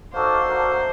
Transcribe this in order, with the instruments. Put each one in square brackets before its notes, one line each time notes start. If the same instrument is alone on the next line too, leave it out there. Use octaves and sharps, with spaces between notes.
[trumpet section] D#4 F#4 A4 D5 F5 [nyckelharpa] C5
[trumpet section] A3 D4 F#4 A#4